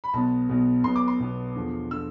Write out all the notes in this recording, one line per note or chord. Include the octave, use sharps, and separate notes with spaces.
B5
B1 B2 B3 A5
B1 B2 B3
B1 B2 B3 C6
D6
C6
B1 B2 B3
E2 D3 F3
D3 F3 E6